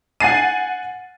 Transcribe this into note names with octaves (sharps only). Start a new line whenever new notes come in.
F#5 G#5 A6 C7 D#7